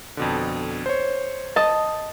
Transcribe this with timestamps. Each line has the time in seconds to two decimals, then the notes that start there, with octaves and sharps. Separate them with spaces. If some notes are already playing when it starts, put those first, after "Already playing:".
0.17 F2 B2 D3
0.86 C5 C#5
1.56 D#5 A5